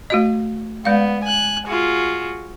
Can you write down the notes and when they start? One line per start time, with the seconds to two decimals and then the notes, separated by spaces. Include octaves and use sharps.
0.10 A3 F#4 D#5
0.85 G#3 B3 D5 F5
1.23 G#5 F#6
1.67 F4 F#4 G#4